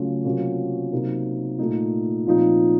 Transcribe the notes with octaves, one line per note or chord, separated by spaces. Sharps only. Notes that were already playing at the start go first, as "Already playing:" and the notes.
Already playing: C#3 F#3 A3 C#4 F4
C3 F#3 A#3 C#4 F4
C3 F#3 A#3 D#4
A#2 A3 D#4
A#2 F3 C4 D#4